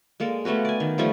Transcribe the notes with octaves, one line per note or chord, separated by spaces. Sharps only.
G#3 A#3 A4 D5
A3 B3 C#4 F#4
D5 G#5
D#3
F3 G3 A3 C#4